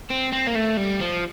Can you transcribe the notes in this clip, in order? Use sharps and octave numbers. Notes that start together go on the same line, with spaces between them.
C4
C4
A#3
A3
G3
F3